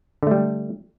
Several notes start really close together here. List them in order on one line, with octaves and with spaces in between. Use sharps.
D3 A3 G3